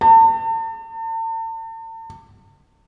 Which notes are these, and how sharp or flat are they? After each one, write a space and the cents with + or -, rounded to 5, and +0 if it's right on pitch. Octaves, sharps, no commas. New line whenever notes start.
A5 +40